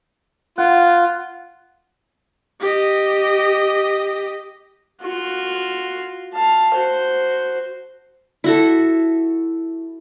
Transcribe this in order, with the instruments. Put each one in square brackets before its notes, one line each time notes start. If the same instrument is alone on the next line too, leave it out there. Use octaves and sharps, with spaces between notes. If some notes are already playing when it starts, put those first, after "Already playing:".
[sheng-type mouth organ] F4 [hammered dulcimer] F#5
[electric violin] G4 D#5
[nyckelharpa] F4 F#4
F5 A5
F#4 C5
[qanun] E4 F#4 A4